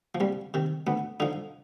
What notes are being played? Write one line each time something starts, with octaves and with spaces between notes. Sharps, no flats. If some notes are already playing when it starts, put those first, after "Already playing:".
F3
C2 G3
C3 D#3
D2 B3
D3 F3 D#4